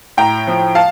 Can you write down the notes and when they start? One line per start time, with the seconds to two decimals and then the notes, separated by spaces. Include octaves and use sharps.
0.18 A2 G5 A#5
0.47 F3
0.75 F5 A5